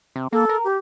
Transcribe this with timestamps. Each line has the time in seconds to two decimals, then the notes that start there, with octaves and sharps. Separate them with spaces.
0.16 C3
0.32 A#3 A4
0.49 A#4
0.64 G4